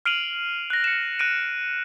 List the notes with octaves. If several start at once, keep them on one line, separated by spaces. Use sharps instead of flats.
F6 C7 D7 D#7 F7 F#7
F#6 A#6
C#7 E7
F#6 A#6 D7 D#7